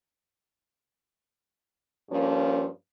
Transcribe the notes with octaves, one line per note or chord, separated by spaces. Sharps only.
G2 F3 A#3 C#4